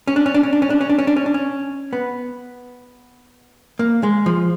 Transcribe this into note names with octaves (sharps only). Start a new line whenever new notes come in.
C#4
D4
C#4
D4
C#4
D4
C#4
D4
C#4
D4
C#4
D4
C#4
D4
C#4
B3
A#3
G#3
F3